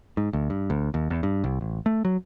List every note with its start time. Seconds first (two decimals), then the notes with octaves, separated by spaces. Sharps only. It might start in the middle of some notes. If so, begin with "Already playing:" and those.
0.17 G#2
0.33 D2
0.50 G2
0.70 D2
0.94 D#2
1.10 E2
1.23 G2
1.44 C2
1.61 A1
1.86 A3
2.05 F#3